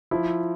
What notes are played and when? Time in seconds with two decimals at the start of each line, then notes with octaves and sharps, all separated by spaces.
0.11 F3 E4